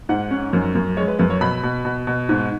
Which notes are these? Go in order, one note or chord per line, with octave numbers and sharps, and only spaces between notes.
G#2 F#5
C#4
F#2
F#2
G#3 C#5
B4
F#2 B4
C#5
B2 B5
B2
B2
B2
G#2